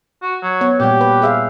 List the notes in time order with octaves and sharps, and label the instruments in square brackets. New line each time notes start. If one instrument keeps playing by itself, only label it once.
[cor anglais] F#4
F#3
[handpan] B3 C#5
[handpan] A#2 G3 [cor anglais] G4
[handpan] B4
G#4 E5 F5